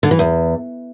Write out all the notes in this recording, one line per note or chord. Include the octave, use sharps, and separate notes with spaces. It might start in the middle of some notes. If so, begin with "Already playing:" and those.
D3
E3
E2